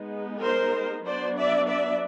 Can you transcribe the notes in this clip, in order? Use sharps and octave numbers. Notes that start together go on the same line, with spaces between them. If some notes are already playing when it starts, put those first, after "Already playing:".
Already playing: G#3 B3 D#4
A#4 C5
F#3 B3 D4 C5 D5
D5 E5
D5 E5